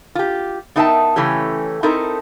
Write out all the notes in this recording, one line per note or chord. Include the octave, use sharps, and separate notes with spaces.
F4 G4
B3 D#4 A#4 E5 G5 A5
C#3 E3 A3 C#4 G4
C4 D#4 E4 A4 A#4